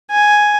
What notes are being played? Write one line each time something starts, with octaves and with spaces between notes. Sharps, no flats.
G#5